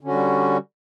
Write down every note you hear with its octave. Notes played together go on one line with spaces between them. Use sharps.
D3 G3 C#4 F#4